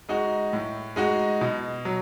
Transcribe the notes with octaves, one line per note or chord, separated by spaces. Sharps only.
G#3 D#4 F#4
A2
G#3 D#4 F#4
B2
F#3